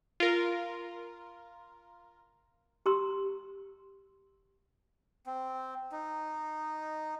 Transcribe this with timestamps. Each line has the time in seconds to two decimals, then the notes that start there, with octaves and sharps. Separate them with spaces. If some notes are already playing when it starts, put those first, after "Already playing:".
0.20 F4 A#4
2.86 G4 A#5 C6 E6
5.26 C4
5.92 D#4